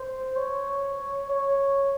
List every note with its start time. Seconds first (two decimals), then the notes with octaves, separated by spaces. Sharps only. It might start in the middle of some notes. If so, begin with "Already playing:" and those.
Already playing: C5
0.36 C#5
1.29 C#5